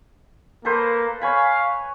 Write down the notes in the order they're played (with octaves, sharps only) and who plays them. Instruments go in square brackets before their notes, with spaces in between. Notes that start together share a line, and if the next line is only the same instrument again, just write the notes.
[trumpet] A#3 [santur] A4 B4 C5
[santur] C#5 G#5 B5 [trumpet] F5